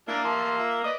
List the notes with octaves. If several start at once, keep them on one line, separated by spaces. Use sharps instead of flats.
A#3 D4 E4 A#4
E5 A5 C6
F4 E5
B4 D5 D#5